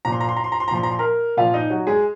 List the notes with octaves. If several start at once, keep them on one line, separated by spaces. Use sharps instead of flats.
A#2 F3 A#5
C6
A#5
C6
A#5
C6
A#5
C6
A#5
A#2 F3 C6
A#5
C6
A#4 A#5
A#2 F3 F4 F5
D#4 D#5
F#3 F#4
G#3 G#4